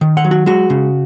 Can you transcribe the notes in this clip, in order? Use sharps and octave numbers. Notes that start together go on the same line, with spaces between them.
D#3
F#5
F#3
F#4
G#3 F#4
C#3